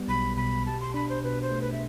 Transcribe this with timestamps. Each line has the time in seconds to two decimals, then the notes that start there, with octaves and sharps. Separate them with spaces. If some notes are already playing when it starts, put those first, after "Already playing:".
Already playing: G3 B3
0.08 B1 B5
0.37 B2 B5
0.66 G4 A5
0.81 C6
0.94 D4 B5
1.09 C5
1.24 B2 B4
1.42 C5
1.52 A3
1.62 B4
1.72 E5